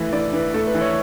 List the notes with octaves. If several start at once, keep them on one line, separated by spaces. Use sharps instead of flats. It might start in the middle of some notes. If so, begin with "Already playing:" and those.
Already playing: E3 A3 B4
E3 D5
E3 B4
A3 A4
B4
E3
C#5